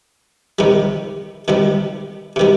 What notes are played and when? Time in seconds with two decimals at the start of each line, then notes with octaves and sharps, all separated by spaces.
0.59 C3 D#3 G3
1.48 C3 D#3 G3
2.36 C3 D#3 G3